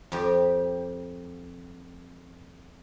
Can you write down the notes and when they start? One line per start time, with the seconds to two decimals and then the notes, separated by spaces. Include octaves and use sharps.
0.12 F2 G4